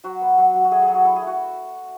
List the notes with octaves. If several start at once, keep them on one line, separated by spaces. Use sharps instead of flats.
F#3 F#4
B3
F#3
F#3
F#4
A3 G#4
G#4
F#3
F#4
E4 A4
G#4
A3
F#4